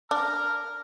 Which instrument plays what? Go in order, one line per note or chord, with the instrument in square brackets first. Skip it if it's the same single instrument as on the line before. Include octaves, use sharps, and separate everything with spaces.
[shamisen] D4 [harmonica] A#5 F6